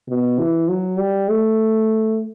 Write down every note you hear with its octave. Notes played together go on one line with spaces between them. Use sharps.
B2
E3
F#3
G3
A3